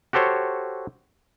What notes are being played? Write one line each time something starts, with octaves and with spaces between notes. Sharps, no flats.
F#4 G4 A4 C5 C#5